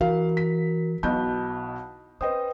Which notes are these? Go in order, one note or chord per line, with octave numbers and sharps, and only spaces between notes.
E3 F#4 A#4 F5
B6
B1 B2 D#4 E4 A5 B5 F#6 G6
C#4 B4 C5 D#5 G5 D#6